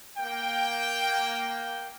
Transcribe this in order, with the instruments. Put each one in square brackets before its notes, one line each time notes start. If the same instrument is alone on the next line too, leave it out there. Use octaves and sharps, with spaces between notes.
[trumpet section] A#3 G5